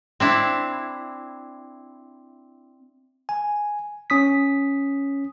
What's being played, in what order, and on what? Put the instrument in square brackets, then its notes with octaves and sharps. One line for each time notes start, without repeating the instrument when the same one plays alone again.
[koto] C4 D4 E4
[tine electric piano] G#5
C#4 D#6 B6